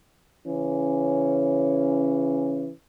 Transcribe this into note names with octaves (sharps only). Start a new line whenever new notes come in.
C#3 E3 C#4